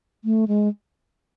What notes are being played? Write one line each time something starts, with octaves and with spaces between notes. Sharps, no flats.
A3
G#3